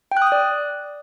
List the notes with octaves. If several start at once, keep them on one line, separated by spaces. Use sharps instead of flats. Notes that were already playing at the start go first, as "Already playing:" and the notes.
G5
F#6
D#6
F#6
D5